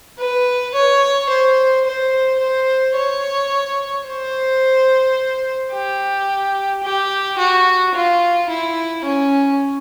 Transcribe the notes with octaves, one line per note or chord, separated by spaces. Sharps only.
B4
C#5
C5
C5
C5
C#5
C5
G4
G4
F#4
F4
E4
C#4